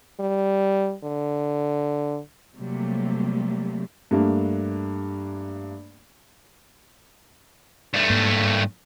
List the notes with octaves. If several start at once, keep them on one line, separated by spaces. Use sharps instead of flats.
G3
D3
C3 F#3 G3 A3 A#3
G2 A3 A#3
G2 A3
G#2 A#3